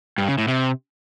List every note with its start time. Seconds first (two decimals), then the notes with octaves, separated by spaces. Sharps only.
0.18 G2
0.28 C#3
0.38 A2
0.48 C3